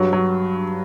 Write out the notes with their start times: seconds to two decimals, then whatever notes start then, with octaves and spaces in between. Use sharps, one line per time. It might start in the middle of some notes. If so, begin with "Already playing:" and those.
Already playing: G2 F#3
0.13 F#3